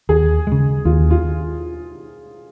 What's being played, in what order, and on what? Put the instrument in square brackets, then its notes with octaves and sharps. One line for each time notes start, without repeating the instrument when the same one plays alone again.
[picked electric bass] D#2 [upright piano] G#4
[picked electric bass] C#3 G#3
[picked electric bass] D#2 [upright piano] F4
[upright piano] F4